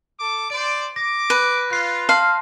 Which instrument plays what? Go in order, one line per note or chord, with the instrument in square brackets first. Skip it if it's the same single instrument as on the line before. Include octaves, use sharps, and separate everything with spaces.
[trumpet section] A4 D6
[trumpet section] C5 D5 [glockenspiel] D7
[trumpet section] D6 [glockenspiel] A#6
[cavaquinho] B4 [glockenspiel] D#7
[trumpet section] F4 [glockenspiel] F#6 C7
[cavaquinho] F5 [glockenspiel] A5 C6 F6